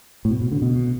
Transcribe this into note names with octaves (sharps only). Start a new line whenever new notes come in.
A2
B2
B2
D3
B2